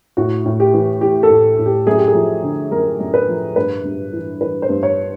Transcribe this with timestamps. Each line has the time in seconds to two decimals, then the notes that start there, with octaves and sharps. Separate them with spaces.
0.17 A2 F#4
0.45 A2
0.60 G4
0.74 E3
1.01 E3 G4
1.23 A4
1.30 A2
1.59 A2
1.66 G4
1.87 F#2 G#4
1.98 G4
2.07 G#4
2.14 F3
2.43 D3
2.72 F#2 A#4
3.00 F#2
3.14 B4
3.28 F3
3.56 G2 B4
3.84 G2
4.13 E3
4.41 E3 B4
4.62 C5
4.69 G2
4.83 C#5